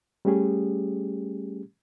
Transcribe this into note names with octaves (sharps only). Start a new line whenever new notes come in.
G3 A3 C#4 G4 G#4